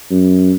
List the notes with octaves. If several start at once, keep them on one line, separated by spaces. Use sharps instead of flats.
F#2